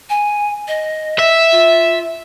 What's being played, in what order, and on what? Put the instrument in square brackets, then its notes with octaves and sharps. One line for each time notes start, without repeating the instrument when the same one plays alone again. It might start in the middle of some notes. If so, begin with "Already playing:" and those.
[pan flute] G#5
D#5
[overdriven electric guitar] E5
[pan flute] F4